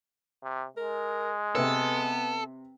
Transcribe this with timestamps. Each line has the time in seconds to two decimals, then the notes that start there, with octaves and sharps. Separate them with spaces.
0.43 C3
0.77 G#3 A#4
1.55 C3 B3 A4 B4